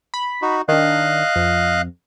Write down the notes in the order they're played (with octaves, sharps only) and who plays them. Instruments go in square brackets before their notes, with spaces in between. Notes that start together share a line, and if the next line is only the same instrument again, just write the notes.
[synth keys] B5
[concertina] D#4 F#4
[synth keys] D#3 D4 [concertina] D#5 F5 F#6
[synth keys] F2